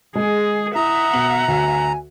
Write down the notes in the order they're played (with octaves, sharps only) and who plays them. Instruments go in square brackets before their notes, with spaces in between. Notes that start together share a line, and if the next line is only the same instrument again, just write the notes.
[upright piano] G#3 [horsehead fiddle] G#4
[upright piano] E4 [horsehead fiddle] E5 F#5 [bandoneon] A#5 [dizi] D#6
[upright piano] B2 F#7
[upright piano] D2 [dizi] G#5